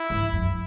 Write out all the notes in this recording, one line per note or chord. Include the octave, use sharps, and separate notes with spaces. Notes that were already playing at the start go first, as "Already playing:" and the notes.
Already playing: E4
G#2
F#2